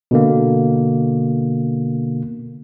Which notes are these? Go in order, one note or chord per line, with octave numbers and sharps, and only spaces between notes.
B2 D3 A#3